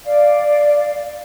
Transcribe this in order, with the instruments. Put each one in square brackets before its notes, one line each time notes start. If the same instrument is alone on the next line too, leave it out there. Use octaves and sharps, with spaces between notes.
[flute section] D5 F5